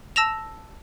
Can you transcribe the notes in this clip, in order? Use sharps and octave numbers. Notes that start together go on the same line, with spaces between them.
A5 E6 A#6 E7 F7